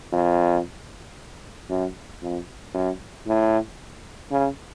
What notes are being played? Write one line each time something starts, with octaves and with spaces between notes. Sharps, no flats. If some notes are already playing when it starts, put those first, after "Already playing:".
F2
F#2
F2
F#2
A2
C#3